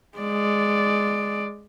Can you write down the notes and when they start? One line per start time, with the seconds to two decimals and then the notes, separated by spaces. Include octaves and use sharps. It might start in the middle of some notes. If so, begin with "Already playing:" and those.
0.18 G#3 D5